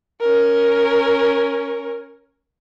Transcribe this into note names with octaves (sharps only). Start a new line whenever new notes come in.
C#4 A#4